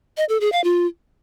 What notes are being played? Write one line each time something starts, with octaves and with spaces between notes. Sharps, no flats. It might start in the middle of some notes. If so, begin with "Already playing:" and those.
D#5
A4
G#4
F5
F4